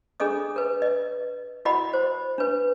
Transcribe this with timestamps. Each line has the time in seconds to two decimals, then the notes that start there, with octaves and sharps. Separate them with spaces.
0.20 D4 G#4 A4 D#5 D#6
0.56 A#4 B4
0.82 D#5
1.65 E4 F#4 A#4 D#5 F#5 B5
1.93 C5
2.38 D4 B4